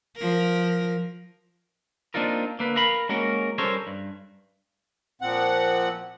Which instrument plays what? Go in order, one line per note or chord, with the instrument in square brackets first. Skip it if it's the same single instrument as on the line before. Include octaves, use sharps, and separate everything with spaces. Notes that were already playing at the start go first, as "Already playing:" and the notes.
[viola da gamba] F3 A#4
[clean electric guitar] A#3 C4 D4 D#4 F4 A#4
D3 A#3 B4
A#4 F5 A#5 B5
G#3 A#3 C#4 F#4 A#4
G3 C#4 A4 A#4 C5 C#5
G2
[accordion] A#2 F3 C4 F#5